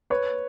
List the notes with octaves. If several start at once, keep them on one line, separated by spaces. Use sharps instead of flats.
B4 C#5